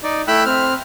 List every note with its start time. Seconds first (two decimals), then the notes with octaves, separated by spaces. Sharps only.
0.03 D#4 D5
0.28 A3 E4 G5 B5 E6 F#6
0.46 C4 F6